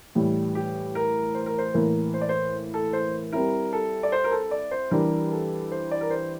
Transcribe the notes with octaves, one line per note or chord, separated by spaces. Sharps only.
A2 E3 G3
G4
A#4
C5
A#4
C5
A2 E3 A#3 A#4
C5
D5
C5
A4
C5
G3 C4 E4 A#4
A4
D5
C5
A#4
A4
D5
C5
E3 G3 D4 G4 A#4
A4
C5
D5
A#4
C5